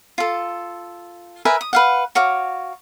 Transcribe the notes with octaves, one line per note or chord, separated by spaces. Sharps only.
F4 A4
A#4 B4 E5 G#5
D#6
B4 F5 F#5
F#4 C#5 F5 D6